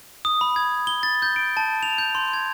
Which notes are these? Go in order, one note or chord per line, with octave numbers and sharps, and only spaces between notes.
D#6
B5
G#6
G7
A6
G6
D7
A5
F7
G6
C6
G#6